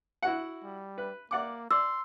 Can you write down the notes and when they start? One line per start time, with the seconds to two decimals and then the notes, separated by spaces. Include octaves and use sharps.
0.23 E4 F#4 F#5
0.63 G3
0.98 B4
1.31 A#3 D5 F#5 D6
1.71 D5 C6 E6